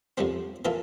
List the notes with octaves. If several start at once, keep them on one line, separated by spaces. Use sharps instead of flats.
F2 D3 G3 C4
E3 A#3 F4 A4